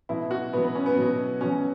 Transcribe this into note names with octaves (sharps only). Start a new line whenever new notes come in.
B2 F#3 E4
F#4
B2 F#3 B3
B3
C#4
B3
B2 F#3
B2 F#3 C#4